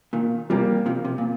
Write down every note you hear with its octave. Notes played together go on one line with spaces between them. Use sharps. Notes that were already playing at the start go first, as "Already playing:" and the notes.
A#2 D#3
C3 F3 G3 A#3 G4
C3 F3
C3
A#2